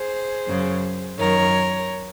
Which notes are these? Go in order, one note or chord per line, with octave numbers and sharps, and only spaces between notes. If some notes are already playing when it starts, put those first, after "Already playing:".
Already playing: G#4 C5
F#2 C#3
F#2 D#3 A#4 C#5